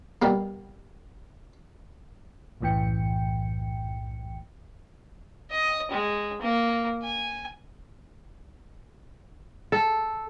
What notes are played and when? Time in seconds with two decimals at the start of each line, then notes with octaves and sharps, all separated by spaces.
0.22 B2 G3 A#3
2.61 B1 F#2 A2 E3 G5 C#7
5.51 D#5
5.91 G#3
6.41 A#3
7.02 G#5
9.72 A4